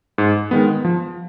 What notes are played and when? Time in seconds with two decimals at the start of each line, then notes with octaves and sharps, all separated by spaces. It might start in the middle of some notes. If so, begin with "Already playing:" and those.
0.18 G#2
0.51 D#3 G#3 B3
0.85 F3